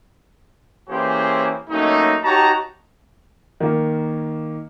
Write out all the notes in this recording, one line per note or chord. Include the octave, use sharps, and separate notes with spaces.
E3 A#3 C#4 G4 G#4 C5
F#3 A3 A#3 C#4 D#4
D#4 F#4 G4 C#5 A5 A#5
D#3 A#3